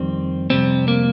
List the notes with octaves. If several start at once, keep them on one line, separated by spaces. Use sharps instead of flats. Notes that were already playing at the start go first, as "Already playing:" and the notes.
Already playing: F2 D#3 G3 C4
F2 C3 G3 C4
A#3